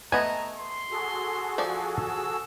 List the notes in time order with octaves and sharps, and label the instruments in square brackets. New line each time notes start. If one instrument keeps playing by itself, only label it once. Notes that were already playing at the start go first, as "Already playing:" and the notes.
[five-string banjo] A3 D#5 [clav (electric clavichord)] B3 G#5 [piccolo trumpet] A#5
[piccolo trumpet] C6
[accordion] F#4 G#4 A4
[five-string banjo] F3 D5
[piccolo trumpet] E6